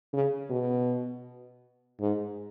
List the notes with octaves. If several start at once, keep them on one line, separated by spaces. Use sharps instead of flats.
C#3
B2
G#2